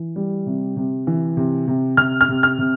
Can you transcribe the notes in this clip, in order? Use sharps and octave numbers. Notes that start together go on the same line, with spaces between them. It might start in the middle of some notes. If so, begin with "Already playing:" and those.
Already playing: E3
G3
C3
C3
E3
C3
C3
C3 F6
F6
C3
F6
C3